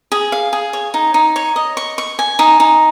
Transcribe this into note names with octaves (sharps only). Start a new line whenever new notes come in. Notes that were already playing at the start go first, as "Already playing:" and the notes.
G#4
F5
G#4
C#5
D#4
D#4
C#5
D#5
C#6
C#6
G#5
D#4
D#4